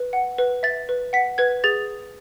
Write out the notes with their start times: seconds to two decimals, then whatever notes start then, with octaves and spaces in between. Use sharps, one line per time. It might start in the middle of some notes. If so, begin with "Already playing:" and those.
Already playing: B4
0.13 F#5
0.38 B4
0.63 E5 A6
0.89 B4
1.13 F#5 B6
1.38 B4 G#6
1.64 G#4 A6